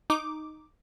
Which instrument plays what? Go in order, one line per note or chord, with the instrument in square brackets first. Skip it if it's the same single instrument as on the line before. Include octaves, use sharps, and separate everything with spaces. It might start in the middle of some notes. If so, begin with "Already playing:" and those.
[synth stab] D#4 D6